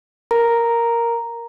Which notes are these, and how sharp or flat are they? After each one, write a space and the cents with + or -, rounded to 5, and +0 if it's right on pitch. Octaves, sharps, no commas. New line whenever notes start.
A#4 +0 A#5 +0